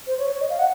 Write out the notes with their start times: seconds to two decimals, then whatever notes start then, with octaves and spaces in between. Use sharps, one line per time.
0.07 C5
0.19 C#5
0.30 C#5
0.41 D#5
0.50 F5
0.59 F#5